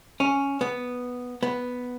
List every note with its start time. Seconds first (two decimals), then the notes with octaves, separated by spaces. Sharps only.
0.20 C#4
0.61 B3
1.43 B3